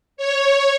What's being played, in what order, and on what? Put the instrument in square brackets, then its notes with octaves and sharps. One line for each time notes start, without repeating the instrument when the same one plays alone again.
[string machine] C#5